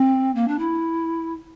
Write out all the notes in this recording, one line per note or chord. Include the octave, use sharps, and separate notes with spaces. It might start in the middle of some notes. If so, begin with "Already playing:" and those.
Already playing: C4
A#3
D4
E4